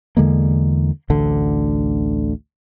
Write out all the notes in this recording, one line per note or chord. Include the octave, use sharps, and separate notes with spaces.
E2 D3 G#3 A#3
A1 D2 D3